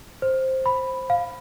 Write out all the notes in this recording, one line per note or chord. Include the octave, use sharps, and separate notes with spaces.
C5
B5
F5